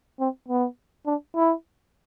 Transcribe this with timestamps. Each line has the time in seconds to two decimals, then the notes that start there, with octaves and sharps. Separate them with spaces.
0.20 C4
0.49 B3
1.07 D4
1.36 E4